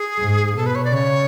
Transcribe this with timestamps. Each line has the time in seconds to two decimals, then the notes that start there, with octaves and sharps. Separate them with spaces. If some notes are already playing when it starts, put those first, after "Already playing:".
Already playing: G#4
0.19 G#2
0.56 B2 A4
0.66 B4
0.75 C#5
0.84 D5
0.93 C#3 C#5